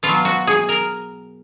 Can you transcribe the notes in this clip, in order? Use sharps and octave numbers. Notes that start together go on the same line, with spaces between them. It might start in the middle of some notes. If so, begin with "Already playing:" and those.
B2 F4
F#3
F#4
G#4
A#4